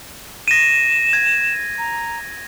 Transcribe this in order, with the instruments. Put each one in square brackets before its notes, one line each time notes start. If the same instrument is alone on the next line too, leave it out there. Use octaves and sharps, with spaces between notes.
[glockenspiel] A#6 D#7 [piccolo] E7
[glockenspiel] G#6
[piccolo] A#5